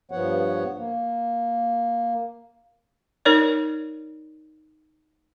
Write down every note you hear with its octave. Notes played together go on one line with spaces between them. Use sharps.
G2 F3 B3 C#5 F#5
A#3
D#4 A#4 C#5 D5